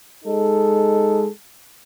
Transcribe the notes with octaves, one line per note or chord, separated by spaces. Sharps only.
G#3 D#4 A4